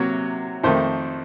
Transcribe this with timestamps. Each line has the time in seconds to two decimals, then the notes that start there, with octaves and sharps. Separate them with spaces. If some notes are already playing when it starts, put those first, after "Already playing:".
Already playing: C3 F#3 A#3 C#5
0.64 F2 D#3 A3 C5